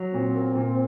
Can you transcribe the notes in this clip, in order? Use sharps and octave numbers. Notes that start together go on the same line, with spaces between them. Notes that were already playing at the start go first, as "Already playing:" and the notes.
Already playing: F#3
A#2 C4
A#3
A#2